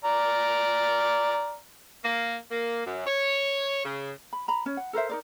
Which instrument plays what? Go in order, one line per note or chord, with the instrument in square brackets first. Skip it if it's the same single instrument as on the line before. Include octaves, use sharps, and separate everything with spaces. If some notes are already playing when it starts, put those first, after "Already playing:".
[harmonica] D5 A#5 F6
[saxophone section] A#3
A#3
F#2
C#5
C#3
[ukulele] B5
A#5 B5
C#4
F#5
A4 A#4 C5 E5
D#4 A#4 D5